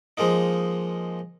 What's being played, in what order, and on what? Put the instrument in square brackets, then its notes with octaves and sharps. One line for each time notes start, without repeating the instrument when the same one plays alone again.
[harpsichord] F3 G#3 A#3 D#4